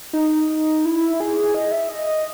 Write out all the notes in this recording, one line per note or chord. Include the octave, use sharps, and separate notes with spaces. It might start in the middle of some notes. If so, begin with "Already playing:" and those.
D#4
E4
G#4
D#5
E5
D#5